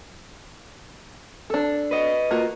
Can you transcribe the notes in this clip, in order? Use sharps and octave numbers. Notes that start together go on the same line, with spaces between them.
D4 A4
B4 D#5
A#3 F4 F#4